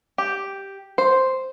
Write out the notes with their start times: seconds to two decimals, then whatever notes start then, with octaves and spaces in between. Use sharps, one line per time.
0.18 G4
0.98 C5